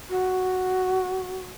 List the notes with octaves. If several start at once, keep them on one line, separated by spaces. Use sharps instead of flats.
F#4